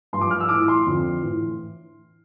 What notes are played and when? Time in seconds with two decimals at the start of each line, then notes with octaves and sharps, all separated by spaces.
0.13 G2 C6
0.17 F3 D6
0.31 F6
0.40 E6
0.49 A2 E3 D6
0.68 C6
0.86 F2 D3 F3
1.22 A2 E3